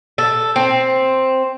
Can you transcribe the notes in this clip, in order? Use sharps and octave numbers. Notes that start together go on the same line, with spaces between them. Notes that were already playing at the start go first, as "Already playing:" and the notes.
A4
C4